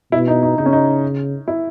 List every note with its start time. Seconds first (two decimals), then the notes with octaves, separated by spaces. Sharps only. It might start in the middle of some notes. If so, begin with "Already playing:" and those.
0.12 B2 E4
0.28 D#4
0.43 D#4
0.58 C#3 D#4
0.66 C#4
0.73 D#4
1.48 E4